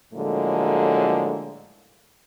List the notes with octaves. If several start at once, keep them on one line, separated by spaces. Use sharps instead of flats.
A2 D3 F3 F#3 G#3 A#3